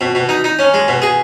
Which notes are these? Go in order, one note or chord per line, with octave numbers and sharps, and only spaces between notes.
B2
B2
D#4
D#4
C#4
G#3
B2
G#4